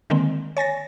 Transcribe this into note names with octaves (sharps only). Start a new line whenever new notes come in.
D3 D#3 G#3 A#3 C4
C#5 G#5 A6 A#6